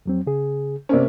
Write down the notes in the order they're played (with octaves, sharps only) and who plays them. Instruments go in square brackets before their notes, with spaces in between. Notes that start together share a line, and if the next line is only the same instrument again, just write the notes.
[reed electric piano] F2 F#3 C4
C#3 G#4
[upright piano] C3 A#3 C#4 [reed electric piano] C5 D5